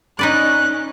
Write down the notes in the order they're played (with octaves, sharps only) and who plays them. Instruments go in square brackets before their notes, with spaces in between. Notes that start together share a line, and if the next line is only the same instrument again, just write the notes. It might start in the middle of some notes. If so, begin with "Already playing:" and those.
[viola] C#4 [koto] D#4 B4 D5 [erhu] F#6